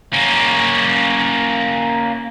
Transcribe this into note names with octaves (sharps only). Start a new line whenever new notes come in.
A#3 C#4